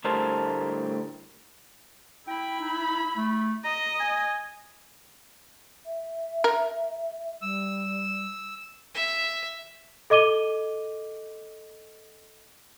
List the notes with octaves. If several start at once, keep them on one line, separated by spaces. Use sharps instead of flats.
D2 A2 G3 A#4 C5 A5
E4 G5 B5
D#4
A3
D#5 A#5
G#5
E5
A#4
G3 E6
E5
A4 D#5 D6 D#7 G7